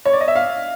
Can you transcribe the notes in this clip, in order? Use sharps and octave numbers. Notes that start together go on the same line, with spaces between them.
C#5
D5
D#5
E5
F5